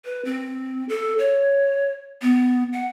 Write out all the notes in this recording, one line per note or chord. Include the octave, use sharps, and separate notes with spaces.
B4
C4
A4
C#5
B3
F#5